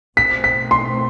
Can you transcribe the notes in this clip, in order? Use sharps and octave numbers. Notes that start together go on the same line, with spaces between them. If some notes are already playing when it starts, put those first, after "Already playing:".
B2 A3 C4 B6
B6
C6